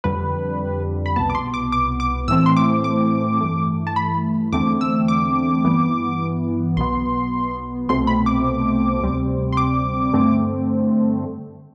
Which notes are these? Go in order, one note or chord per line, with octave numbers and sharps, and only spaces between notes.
F2 D3 G3 B4
B5
C2 B2 B3 A5
D6
C6
D6
D6
D6
A2 E3 A3 C4 E6
C6
D6
D6
G2 E3 A3
A5
B5
E2 D3 A3 C4 D6
E6
D6
G2 E3 B3
B1 B2 B3 C6
C2 B2 A3 C4 C6
B5
D6
D2 C3 G3 C4
C6
D6
G2 D3 A3 C4